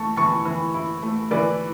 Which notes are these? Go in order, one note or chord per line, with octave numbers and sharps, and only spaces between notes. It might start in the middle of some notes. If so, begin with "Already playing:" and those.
Already playing: E3 A3 A5 C#6
E3 A5 C#6
E3
E4
A3
E3 B4 D5